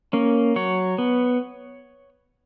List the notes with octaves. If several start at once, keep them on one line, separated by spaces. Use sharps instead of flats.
A#3 C#4
F#3 C#5
B3